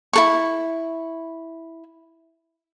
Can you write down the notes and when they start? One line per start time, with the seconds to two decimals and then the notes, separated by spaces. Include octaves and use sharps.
0.13 E4 A4 C#6